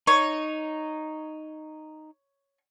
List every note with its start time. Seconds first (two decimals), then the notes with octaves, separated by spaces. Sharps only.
0.07 D#4 C#5